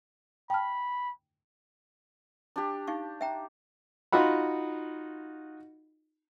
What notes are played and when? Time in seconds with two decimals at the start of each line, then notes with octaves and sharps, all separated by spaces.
0.50 G5 A5 B5 F6
2.56 D4 G4
2.88 D#4 F5 C#6
3.21 E5 G5 A#5
4.12 D#4 F4 F#4 F#5 B5